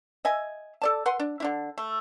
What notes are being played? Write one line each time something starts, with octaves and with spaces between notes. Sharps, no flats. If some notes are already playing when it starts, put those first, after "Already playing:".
D#5 E5 G#5
A4 D5 A5
B4 F#5 C6
D4
D3 D4 E4
A3